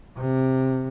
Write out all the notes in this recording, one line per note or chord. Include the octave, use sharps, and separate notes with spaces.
C3